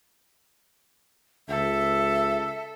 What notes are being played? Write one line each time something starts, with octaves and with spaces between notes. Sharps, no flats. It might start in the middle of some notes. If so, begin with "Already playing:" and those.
C#2 A4 E5